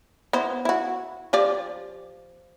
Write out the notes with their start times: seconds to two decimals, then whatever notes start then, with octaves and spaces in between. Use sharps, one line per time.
0.33 B3 E4 C5
0.65 E4 F#4
1.33 F3 G4 D5